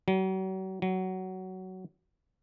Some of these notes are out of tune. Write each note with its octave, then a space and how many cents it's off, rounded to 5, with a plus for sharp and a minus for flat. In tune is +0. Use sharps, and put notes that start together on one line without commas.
F#3 +40
F#3 +15